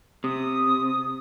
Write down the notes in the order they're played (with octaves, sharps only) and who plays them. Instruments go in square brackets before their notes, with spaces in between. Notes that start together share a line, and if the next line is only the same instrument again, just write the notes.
[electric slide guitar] C3 [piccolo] D#6